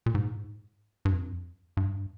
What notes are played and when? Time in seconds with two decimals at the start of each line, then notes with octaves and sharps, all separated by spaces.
0.06 A#2
0.15 G#2
1.05 G2
1.13 F2
1.77 G2